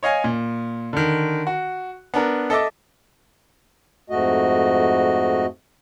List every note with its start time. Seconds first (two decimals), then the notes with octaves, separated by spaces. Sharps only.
0.03 C#5 D#5 F5 G#5
0.24 A#2
0.93 D3 D#3
1.47 F#4
2.14 B3 D4 A#4
2.50 A4 D#5 E5 D6
4.10 F2 G#2 A3 F#4 D#5